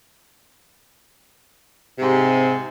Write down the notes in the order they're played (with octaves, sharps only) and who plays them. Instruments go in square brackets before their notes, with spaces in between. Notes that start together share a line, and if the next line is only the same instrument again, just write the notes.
[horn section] G#2 C3